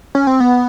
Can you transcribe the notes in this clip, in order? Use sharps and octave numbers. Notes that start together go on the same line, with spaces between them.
C#4
C4
B3